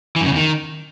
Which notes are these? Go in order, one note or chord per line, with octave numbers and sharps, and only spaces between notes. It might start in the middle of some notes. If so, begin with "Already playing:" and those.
E3
F#2
C#3
E2
D#3